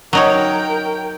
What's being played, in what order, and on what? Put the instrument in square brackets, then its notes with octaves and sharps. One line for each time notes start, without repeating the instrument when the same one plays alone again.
[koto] F#3 D#4 C#5 [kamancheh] A#4 G5